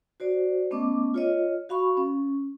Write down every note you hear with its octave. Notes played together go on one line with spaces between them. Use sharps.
F#4 C5 D5
A3 B3 C#4 D#5 D6
F4 C#5 D#5
F#4 F5 B5 C#6
C#4